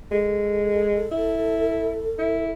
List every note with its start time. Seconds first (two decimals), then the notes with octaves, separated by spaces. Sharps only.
0.11 G#3 A4
1.11 E4
2.19 E4